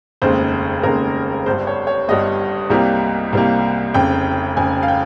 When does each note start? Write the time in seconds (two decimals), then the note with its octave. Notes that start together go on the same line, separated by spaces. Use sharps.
0.22 F1 D#2 C#3 G#3 C5
0.83 F1 D#2 C#3 G#3 A#4
1.46 G1 G2 G3 C5
1.67 C#5
1.87 C#5
2.08 G1 G2 G3 D#5
2.70 C2 C3 G3 A#3
3.33 C2 C3 G3 A#3
3.94 F1 F2 C#3 G5
4.57 F1 F2 C#3 G#5
4.83 F5
4.88 G5